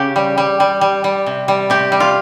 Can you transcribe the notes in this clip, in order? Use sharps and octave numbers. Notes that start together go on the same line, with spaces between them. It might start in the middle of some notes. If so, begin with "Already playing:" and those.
Already playing: C#3 G4
G3
G3
G3
G3
G3
C3
G3
C3 G4
G3
F4